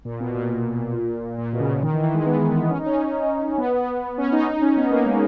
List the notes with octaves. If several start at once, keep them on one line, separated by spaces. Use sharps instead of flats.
A#2
B2
A#2
A#2
B2
C#3
D#3
E3
E3
G#3
B3
B3
C#4
D#4
C#4
B3
B3
C#4
D#4
D#4
C#4
B3
A#3
G#3